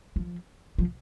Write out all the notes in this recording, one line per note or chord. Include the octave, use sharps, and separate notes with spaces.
F3
F3